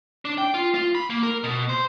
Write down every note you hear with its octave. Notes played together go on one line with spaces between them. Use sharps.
D4
G5
F4
F4
B5
A#3
A#4
B2
C5